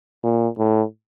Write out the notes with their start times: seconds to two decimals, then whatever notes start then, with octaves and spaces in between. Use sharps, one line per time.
0.23 A#2
0.58 A2